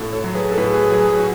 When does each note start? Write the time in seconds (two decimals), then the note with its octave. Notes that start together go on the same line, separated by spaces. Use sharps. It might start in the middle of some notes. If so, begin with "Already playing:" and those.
Already playing: A2 F#4 A4
0.13 A4 C#5
0.24 F#3
0.35 G#4 B4
0.52 A4
0.57 A2 G#4 B4
0.74 G#4
0.91 F#3 G#4
1.08 G#4
1.20 F#4